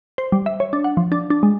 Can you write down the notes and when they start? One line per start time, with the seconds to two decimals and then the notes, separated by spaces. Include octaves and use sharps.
0.18 C5
0.32 G3
0.46 E5
0.60 C#5
0.73 D4
0.84 F#5
0.97 F3
1.12 D4
1.30 D4
1.43 G#3